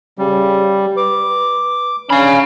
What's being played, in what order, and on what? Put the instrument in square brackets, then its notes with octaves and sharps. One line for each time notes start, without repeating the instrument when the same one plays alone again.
[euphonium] C#3 [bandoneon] G3
[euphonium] B4 [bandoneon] D6
[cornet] C#4 [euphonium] D4 [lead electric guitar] F5 B5